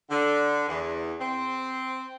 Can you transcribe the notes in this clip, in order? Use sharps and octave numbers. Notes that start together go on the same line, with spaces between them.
D3
E2
C4